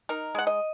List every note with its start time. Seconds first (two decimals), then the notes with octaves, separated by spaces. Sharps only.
0.09 D#4 A#4
0.35 G#3 F#5
0.47 D#5